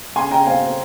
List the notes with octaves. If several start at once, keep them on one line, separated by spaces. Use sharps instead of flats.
C#3 G#5 C6
C#3 G5 A#5
C4 F5 G#5
C4